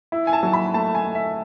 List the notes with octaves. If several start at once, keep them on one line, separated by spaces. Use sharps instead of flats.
E4
G#5
A5
F#3
B5
A3 A5
G#5
A3
E5